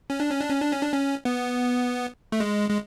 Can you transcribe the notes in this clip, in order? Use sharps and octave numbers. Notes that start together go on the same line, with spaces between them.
C#4
D4
C#4
D4
C#4
D4
C#4
D4
C#4
B3
A3
G#3
G#3